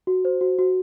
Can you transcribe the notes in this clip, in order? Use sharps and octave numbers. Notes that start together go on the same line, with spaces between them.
F#4
C5
F#4
F#4